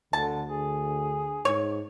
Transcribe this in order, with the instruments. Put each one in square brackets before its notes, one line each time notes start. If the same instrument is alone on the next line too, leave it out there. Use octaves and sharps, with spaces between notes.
[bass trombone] D2 [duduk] D3 [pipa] A5
[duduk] G#4
[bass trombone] G#2 [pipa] C#5